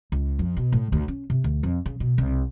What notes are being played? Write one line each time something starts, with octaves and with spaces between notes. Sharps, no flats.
C#2
F2
B2
A2
D2
C#4
C3
D2
F2
C#3
B2
C2